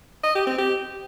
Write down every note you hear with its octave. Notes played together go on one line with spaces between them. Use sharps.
D#5
G4
C4
G4